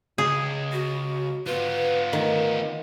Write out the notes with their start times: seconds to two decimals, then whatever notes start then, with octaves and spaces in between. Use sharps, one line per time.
0.18 C#2 G#4
0.72 F#4
1.47 B3 F4 B4
2.13 D#3 A3